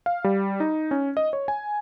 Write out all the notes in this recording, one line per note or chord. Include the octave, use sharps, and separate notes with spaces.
F5
G3
D#4
C#4
D#5
C#5
G#5